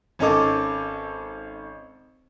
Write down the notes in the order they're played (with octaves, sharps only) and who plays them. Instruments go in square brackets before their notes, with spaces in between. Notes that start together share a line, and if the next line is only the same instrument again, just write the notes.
[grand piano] G#1 C#4 D#4 A4 D6